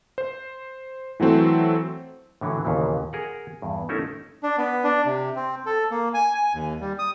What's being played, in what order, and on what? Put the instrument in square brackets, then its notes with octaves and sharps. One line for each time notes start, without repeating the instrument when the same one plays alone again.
[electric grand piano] C5
E3 F#3 A3 C4
[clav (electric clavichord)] A2 D3 E3 F#3
D#2 A#2 C#3 E3
G#4 A#4 F#5
E2 G2
A3 C#4 D#4 E4 A#4 E5
[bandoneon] D4
B3
D4
C3
C4
A4
A#3
G#5
G#5
D#2
G3
D#6